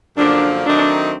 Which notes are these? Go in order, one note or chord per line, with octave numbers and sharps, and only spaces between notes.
F#2 D3 F3 A#3 D4
D#3 F#3 A3 C4 D4 D#4